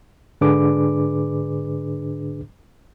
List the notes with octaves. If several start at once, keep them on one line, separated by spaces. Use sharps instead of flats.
G#2 D3 D4 G#4 B4 D6